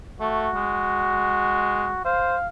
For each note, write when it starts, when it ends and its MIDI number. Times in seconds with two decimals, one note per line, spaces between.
0.20 0.49 57
0.20 2.02 66
0.55 1.92 56
2.05 2.36 72
2.05 2.48 77